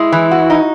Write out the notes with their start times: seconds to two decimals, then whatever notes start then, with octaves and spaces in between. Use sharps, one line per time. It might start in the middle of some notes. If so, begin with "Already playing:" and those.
Already playing: G#3 E4
0.12 E3
0.31 F#4
0.50 D#4